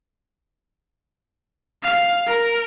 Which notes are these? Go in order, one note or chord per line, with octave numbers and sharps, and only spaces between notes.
F5
A#4